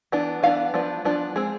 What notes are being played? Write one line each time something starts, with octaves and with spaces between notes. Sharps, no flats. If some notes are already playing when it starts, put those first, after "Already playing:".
E3 B3 D4
E3 B3 D4 F5
F3 B3 D4
F3 B3 D4
G#3 C4 G#4